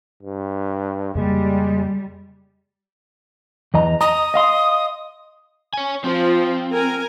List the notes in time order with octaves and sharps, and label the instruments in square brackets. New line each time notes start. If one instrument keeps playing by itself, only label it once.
[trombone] G2
[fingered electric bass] F2 C#3 A#3 [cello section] G3 [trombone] G#3
[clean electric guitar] E2 D#5 A#5
[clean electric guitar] D#5 A#5 [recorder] D#6
[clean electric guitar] D#5 F5 C6
[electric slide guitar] C#5 G#5
[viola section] F3 [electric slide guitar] C4
[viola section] A#4 G#5